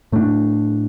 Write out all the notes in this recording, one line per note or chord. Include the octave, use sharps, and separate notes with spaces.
A2 A3 D4